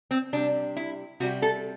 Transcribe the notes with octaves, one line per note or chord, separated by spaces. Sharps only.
C4
C3 G3 D4
E4
C3 G3 F#4
A4